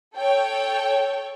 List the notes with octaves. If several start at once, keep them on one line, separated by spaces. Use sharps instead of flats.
A4 C#5 G5